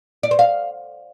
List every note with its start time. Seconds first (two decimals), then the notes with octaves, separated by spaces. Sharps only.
0.23 D5
0.31 C5
0.39 F5